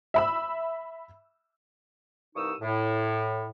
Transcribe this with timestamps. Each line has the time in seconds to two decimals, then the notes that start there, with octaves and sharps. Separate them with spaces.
0.14 E5 B5 E6
2.35 C2 G2 D#4 C#6 D#6 E6
2.61 A2